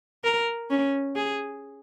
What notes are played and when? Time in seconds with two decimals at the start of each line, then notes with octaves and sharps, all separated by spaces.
0.24 A#4
0.70 C#4
1.15 G#4